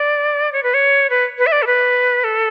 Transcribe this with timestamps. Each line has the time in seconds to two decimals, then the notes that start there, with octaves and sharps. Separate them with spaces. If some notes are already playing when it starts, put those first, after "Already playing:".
Already playing: D5
0.53 C#5
0.63 B4
0.74 C#5
1.10 B4
1.39 B4
1.47 E5
1.52 D5
1.62 A4
1.67 B4
2.24 A4